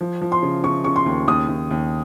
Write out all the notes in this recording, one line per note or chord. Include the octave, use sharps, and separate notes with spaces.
F3
F3
C6
C#3
C#3 C#6
C#3 C#6
C6
D#2
D#2 D#6
D#2
D#2